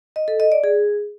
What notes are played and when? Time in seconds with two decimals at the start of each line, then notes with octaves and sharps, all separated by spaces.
0.16 D#5
0.28 A4
0.40 D#5
0.52 D5
0.64 G#4